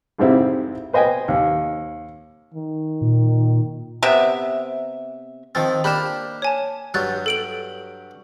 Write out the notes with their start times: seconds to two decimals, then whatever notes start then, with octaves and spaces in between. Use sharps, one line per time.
0.18 F2 G#2 C3 G3 C4 E4
0.93 B4 C5 D#5 G5 G#5
1.28 D#2
2.54 D#3
3.01 A#2
4.03 C3 B3 E5
5.55 D#3 F3 C4 A6
5.84 A#3 D4 G4 B5 E7
6.42 C#5 G#5 A5
6.94 G2 F#3 F#6 A6
7.26 A4 D7 F#7